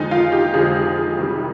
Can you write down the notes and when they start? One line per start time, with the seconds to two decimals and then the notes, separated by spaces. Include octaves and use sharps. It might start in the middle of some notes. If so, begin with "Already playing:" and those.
Already playing: F1 D#2 D3 F3 G#3 D#4
0.11 F4
0.32 G4
0.54 F1 D#2 D3 F3 G#3 G#4
1.17 C2 C3 D#3 G3